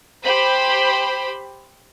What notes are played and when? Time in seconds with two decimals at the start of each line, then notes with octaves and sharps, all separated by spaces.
0.24 G4 C5 B5